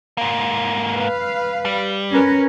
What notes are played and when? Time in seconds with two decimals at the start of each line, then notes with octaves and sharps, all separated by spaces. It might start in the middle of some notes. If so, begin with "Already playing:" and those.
0.18 G#2 A#3
0.93 B4 F5
1.65 G3
2.10 C#4 A#4 B4